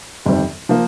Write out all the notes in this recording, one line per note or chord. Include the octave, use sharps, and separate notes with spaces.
G1 F2 D#3 G3 C4
F3 A#3